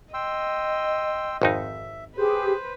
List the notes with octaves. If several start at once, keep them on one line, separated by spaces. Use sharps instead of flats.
D#5 G5 C6 E6
G#1 F2 D#4 E5
G4 G#4 B4 C5